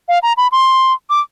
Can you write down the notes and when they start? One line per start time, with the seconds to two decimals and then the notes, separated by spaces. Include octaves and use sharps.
0.09 F5
0.23 A#5
0.37 B5
0.52 C6
1.10 D6